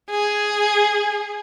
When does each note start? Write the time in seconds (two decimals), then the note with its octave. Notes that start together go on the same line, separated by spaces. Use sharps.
0.10 G#4